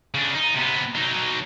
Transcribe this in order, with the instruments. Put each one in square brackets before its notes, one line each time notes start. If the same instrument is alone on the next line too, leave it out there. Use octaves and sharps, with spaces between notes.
[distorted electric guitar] C#3 D4
D#4
C3 B3
F#3 D#4